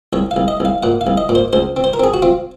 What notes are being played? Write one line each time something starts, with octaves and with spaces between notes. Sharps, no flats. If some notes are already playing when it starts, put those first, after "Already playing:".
C2 C#5
F5
C2
D#5
C2 F5
A#2 F#5
F5
C2
D#5
A#2
C5
C#2 C5
C4
C5
A#4
C4 G#4
F#4
C4 F4